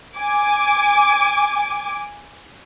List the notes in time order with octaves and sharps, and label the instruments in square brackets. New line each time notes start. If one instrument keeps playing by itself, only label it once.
[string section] G#5 D6